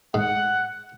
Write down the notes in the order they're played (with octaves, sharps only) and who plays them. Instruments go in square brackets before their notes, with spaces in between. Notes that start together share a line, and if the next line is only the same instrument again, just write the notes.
[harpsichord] G#2 [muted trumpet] F#5